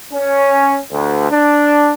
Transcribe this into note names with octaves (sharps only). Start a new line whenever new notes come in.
C#4
D2
D4